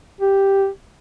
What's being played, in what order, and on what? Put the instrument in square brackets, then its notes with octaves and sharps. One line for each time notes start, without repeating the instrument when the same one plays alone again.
[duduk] G4